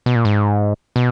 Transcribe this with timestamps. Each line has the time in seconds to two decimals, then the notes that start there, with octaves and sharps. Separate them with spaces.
0.06 B2
0.16 A#2
0.25 G#2
0.96 B2